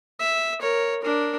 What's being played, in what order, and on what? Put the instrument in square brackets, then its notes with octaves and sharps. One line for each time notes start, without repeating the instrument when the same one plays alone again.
[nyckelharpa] E5
A#4 C#5
D4 A#4